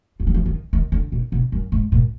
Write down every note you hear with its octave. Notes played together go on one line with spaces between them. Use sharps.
F3
F#3
F3
D#3
D#3
D3
A#2
B2
F#2
G#2
A#2